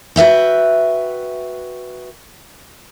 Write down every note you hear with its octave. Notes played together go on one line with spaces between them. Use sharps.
F#4 B4 E5 G5